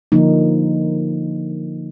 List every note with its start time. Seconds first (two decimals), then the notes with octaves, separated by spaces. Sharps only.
0.12 D3 F3 A#3 D#4